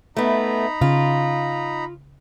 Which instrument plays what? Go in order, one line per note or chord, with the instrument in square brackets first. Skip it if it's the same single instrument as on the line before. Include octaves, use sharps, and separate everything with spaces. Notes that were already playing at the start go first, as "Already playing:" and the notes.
[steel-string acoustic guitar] A3 B3 [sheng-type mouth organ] D#4 A#5 B5
[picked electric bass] C#3 [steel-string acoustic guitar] F4